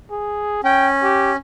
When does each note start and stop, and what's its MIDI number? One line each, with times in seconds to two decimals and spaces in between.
0.10 0.60 68
0.64 1.36 61
0.64 0.88 79
1.03 1.32 67